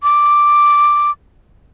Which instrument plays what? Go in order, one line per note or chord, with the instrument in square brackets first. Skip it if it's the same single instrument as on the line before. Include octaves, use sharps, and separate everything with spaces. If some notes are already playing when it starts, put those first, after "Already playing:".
[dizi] D6